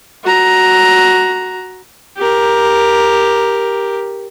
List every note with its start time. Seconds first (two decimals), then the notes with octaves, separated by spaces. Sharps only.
0.24 F#4 A#5
2.17 G4 A#4